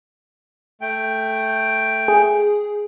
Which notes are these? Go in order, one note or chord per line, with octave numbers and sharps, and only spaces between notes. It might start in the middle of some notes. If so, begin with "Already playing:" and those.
A3 G5
G#4